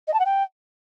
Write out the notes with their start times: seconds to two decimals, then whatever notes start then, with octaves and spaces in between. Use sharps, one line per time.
0.07 D#5
0.13 A5
0.19 F#5
0.25 G5